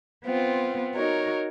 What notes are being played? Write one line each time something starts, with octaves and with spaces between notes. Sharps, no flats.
B3 C4 F4
D#4 F#4 A#4 C#5